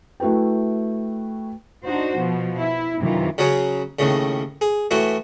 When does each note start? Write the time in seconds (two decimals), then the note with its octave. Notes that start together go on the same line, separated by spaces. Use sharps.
0.20 A3 E4 F#4 B4 G5
1.85 D4 D#4 F#4 C5
2.16 B2 F3
2.58 E4
3.00 F#2 C3 D#3 E3 F4
3.38 C#3 F#3 C#4 G#4
3.99 D#2 A2 C#3
4.61 G#4
4.91 A2 E3 E4 F#4